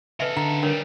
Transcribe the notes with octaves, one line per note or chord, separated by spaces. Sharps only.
C#3 A4 B4 D#5 E5
D3 A#5
D#3 G3 D4 A#4 C#5